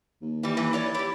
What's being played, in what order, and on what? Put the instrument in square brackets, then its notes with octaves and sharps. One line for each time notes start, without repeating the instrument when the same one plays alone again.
[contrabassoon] D#2
[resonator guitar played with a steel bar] E3 G3
G2 E3
E4 C#5 D5
E4 G4